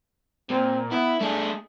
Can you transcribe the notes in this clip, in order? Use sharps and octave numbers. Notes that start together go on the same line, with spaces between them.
A#2 C4
B3 E4
A3 D4 G#4